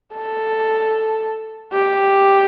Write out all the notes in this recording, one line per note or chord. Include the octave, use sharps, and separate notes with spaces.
A4
G4